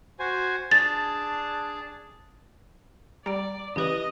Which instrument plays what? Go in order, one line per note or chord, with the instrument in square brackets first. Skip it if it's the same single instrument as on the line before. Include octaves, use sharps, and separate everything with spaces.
[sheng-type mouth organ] F#4 C5 G#5
[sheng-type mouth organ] D4 G#4 A5 [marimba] A6
[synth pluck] G3 [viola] D5 [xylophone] A#5 D7
[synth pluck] C#3 E3 F#6 [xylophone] G4 B4 [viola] D#5